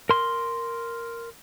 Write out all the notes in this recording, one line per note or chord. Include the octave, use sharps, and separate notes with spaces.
A#4 C6